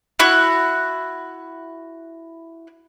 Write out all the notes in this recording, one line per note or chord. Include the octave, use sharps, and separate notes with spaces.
E4 F#4 F#6